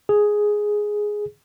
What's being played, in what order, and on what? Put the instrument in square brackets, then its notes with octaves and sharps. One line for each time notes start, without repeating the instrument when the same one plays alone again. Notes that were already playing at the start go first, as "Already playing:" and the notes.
[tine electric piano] G#4